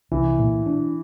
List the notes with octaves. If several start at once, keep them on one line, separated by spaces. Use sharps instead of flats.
C2 E3
A#2
D4